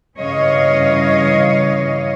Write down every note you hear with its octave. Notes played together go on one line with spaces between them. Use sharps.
G2 C#3 E3 C#5 D#5 F5